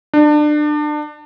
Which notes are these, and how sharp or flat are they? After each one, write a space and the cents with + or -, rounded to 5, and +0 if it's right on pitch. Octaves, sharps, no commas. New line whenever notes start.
D4 +30